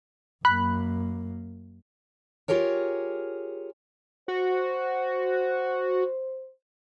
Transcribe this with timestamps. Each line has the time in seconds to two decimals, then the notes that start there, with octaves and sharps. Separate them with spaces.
0.45 F#2 A#3 B5 F#6
2.48 F4 G4 G#4 A#4 C#5
4.28 F#4 C5